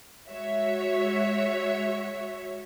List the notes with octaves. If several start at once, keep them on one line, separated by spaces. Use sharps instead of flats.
G#3 F#4 C#5 E5